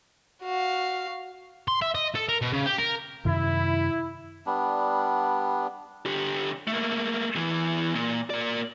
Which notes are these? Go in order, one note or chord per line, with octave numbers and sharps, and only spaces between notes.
F#4 F5
C6
E5
D#5
A4
A#4
B2
C#3
G4
A#4
F#2 C3 D#3 E4
G3 B3 D4
D3 G4
A3 A#3
E2 E3
A#2
A#3 D5